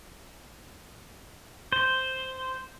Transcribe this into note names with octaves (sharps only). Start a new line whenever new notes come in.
C5